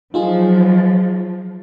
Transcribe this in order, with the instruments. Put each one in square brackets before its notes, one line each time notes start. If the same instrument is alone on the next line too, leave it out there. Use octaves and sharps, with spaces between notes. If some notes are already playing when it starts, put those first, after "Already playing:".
[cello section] F3 F#3 [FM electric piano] D#4 F4 G#4